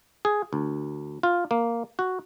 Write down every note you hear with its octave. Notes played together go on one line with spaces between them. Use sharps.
G#4
D2
F4
A#3
F#4